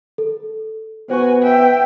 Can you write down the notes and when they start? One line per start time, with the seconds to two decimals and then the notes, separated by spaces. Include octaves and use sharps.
0.18 A4
1.10 B3 F#4 C5 G#5 C#6
1.43 E5 G5